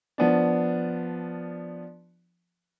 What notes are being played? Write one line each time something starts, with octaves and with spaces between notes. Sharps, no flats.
F3 B3 D4